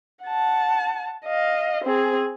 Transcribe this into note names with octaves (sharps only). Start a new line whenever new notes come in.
F#5 A5
D#5 F5
C4 G#4